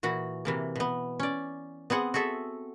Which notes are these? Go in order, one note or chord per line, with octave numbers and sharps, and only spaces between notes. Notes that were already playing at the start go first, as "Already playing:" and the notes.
A#2 E3 F#4 F#5
C3 E3 A#3
B2 B3
C#4 D5
B3 C4 G#4 F#5
F#4 G#4 A4 E5